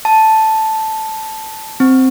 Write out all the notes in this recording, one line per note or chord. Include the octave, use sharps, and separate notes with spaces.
A5
C4